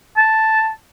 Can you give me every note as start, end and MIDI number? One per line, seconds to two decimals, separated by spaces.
0.17 0.70 81